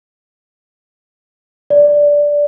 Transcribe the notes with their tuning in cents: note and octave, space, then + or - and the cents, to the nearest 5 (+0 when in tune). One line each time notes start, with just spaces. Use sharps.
D5 -10